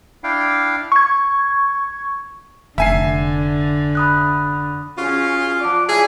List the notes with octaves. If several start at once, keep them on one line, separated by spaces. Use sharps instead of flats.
D4 E4 F5 G5
C#6 G#6
F1 D3 E5 G#5 C7
B5 D#6 F#6
C#4 F4 F#4 G#4 B4
F3 F#4 D5 D6
E4 G#4 C#5 E5 F5 G#5